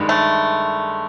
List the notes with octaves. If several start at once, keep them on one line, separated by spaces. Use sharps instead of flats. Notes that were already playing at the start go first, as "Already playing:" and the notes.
Already playing: G2 D#3 G#3
A3